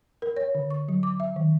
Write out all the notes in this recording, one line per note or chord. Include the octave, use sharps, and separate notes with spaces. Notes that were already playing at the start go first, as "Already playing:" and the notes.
A#4
C#5
D3
C#6
F#3
D6
E5
D#3